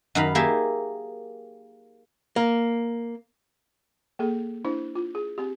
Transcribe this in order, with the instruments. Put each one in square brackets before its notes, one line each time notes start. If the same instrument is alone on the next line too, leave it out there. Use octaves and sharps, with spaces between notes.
[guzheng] F#2 D#3 F5 B5
A#3 G4 G#4 E5
[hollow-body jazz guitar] A#3
[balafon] A#3 G#4 A4
D4 E4 C5
F4
G#4
C4 G4